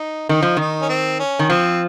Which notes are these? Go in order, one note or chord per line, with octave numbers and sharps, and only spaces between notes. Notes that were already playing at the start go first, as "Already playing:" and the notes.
Already playing: D#4
D#3 D#4
F3
D#3 D#4
C#4
C4
C#4
D#3
F3 C4